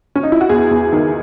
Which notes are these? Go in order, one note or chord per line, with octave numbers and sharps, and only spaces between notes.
C#4
D#4
E4
F#4
E2 G#4
E2
D#3